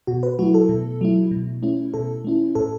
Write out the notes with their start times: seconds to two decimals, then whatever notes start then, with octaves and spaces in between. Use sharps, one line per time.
0.07 B2 F#4
0.23 B4
0.39 F#3 A3 E4 F#4
0.54 A4
0.69 B2
1.01 F#3 A3 E4
1.31 B2
1.63 A3 C#4 E4
1.94 B2 A4
2.24 A3 C#4 E4
2.55 A2 A4